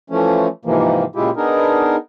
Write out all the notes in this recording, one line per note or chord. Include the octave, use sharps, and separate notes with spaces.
E3 F3 A3 C#4
G#2 C3 E3 F3 A#3
A#2 C#3 G#3 E4 F4 G4
B3 D4 D#4 G#4 A#4